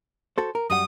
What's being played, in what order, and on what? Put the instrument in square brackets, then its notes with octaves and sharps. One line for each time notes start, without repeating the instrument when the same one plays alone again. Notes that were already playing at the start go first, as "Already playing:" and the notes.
[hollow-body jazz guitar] F#4 A4 C5
A#4
[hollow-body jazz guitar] F#2 G3 F#5 [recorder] D#6